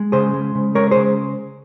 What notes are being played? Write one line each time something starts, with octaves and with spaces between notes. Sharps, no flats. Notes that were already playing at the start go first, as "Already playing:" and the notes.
Already playing: G#3
C#3 G#4 C5
G#3
C#3
G#3 A#4 C#5
C#3 G#4 C5